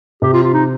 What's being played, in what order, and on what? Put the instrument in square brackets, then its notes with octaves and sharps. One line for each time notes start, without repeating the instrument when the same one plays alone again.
[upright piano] C3 [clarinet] G4
[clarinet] F4
F4
D#4